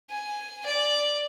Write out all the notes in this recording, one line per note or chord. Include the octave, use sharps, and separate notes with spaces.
G#5
D5